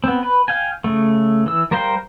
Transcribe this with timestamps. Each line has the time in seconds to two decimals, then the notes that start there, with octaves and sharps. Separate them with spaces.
0.04 B3 C4
0.23 B4
0.48 F5 G5 G#5
0.84 C#3 A3
1.46 E3 E6
1.71 G3 A#4 C5 F5 G5